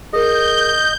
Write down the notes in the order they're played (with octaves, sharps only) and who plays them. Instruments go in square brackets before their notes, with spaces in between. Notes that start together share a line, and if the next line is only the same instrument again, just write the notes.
[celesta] G#4 A#4 [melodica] D#5 [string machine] G6